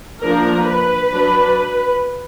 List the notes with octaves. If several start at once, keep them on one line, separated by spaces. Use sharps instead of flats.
F3 A#3 D4 A#4
B4
F#3 D4